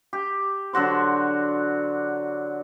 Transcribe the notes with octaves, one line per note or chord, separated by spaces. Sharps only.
G4
D3 F#3 F#4 C5